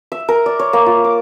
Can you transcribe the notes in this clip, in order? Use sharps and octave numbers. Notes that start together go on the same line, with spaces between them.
E5
A#4
D5
C#5
A#3
F4
D6